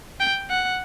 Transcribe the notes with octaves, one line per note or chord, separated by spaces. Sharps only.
G5
F#5